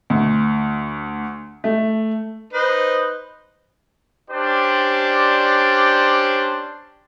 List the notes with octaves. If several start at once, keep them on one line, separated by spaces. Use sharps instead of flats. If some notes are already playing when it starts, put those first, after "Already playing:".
D2
A3
D#4 B4 C5
C#4 D4 G4 C5 D5